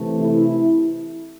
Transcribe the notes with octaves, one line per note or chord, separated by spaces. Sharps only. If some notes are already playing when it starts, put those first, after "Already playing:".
Already playing: C3 E3 A3
E4